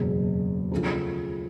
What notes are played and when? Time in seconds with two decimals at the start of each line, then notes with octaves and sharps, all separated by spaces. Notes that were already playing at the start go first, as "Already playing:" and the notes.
Already playing: F#1 E2 B2 G#3
0.72 D2 C#3 F3